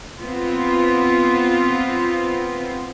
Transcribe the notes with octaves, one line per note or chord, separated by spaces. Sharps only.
B3 C4 F4